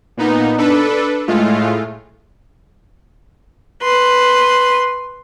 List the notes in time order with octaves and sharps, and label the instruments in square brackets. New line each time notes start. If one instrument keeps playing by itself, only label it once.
[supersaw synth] A#2 B3 D#4
D4 A4 B4
A2 G#3 A3 F4
[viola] B4 C6